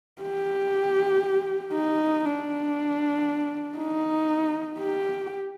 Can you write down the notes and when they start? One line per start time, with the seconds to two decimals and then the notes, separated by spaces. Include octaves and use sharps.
0.22 G4
1.74 D#4
2.25 D4
3.78 D#4
4.79 G4